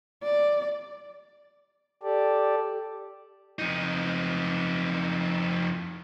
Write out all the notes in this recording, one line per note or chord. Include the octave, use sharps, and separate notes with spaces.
D5
G4 A4 D5
F2 D#4